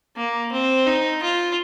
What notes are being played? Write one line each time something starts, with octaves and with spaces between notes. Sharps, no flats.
A#3
C4
D#4
F4